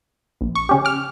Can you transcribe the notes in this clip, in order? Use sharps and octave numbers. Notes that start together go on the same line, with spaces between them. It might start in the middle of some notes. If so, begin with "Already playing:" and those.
A#1
C#6
C#3 C#4 G4
D6 F6